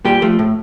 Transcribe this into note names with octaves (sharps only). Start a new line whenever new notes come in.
A#2 G3 G4
F3 A3
A2